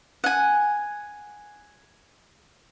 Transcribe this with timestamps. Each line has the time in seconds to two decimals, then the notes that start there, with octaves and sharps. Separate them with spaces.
0.24 F#5 G#5